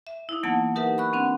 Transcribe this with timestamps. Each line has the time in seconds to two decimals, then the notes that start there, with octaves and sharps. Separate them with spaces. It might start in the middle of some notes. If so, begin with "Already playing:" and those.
0.07 E5
0.29 D#4 E4
0.43 E3 F#3 A#3 B3 F#5 A5
0.75 D#4 G4 A#4 B4 E5 F#5
0.98 B5 C#6 F#6
1.13 C4 D4 F#5